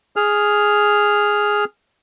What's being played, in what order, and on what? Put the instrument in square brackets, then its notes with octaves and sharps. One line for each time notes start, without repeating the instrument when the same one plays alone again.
[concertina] G#4 F6